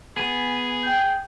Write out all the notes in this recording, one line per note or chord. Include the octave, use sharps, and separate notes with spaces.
B3 G#4 G#5
G5 G6